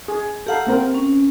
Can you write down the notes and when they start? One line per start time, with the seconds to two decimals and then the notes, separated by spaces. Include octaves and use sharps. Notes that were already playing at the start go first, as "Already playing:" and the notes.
0.08 G#4
0.47 G4 A4 F5 F#5 A#5
0.67 A#3 C4 A#4
0.95 C#4